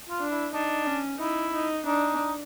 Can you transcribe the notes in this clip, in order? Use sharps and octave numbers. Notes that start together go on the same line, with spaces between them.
F4
D4
E4
D4 D#4
C#4
D#4 E4
D#4
D4 D#4